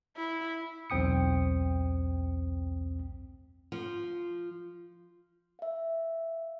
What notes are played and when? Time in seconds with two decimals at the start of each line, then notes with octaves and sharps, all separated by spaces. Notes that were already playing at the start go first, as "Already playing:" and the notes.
0.17 E4
0.90 B1 E2 C4 G5 D#6 C#7
3.72 F3
5.59 E5 F5